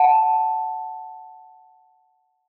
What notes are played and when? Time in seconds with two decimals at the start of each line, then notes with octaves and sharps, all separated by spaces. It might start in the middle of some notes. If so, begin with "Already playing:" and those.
Already playing: F#5 A5